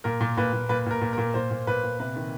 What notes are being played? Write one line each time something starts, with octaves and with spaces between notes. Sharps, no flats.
A#2 A#4
A#2
A#2 B4
A#2
A#2 B4
A#2 A#4
A#2
A#4
A#2
A#2 C5
A#2
A#2 B4
A#2
C3 B4
D#3